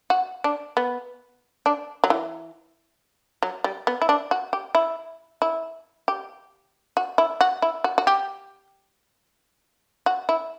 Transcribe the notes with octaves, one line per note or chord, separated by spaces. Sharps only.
F#4
D4
B3
D4
F#3
E3
F#3
G3
B3
E4
D4
F#4
G4
E4
E4
G4
F#4
E4
F#4
E4
F#4
F#4
G4
F#4
E4